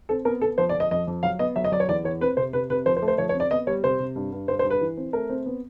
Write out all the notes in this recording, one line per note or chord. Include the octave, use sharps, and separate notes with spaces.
C4 A4
B3 A#4
B3 A4
F3 C5
D5
F3
D#5
F2 D#5
F2
F#3 F5
B3 D#5
F#3 E5
D#5
F#3 D5
C#5
E2 D5
E2 C#5
C4 B4
C3 C5
C3 B4
C3 B4
F3 C5
C5
A3
C5
F3 C#5
C#5
C4
D5
B3 D#5
G3 C#5
C3 C5
C3
G2
G2
G2 C5
C5
G2
B4
E3
C4
A3 A#4
C4
B3